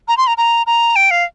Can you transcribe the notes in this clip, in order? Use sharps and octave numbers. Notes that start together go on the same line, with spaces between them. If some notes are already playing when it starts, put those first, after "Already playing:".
A#5
C6
A#5
A#5
A#5
G5
F5